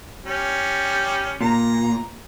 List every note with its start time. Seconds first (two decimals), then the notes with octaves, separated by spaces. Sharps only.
0.24 G3 C#4
1.41 A#2 A#5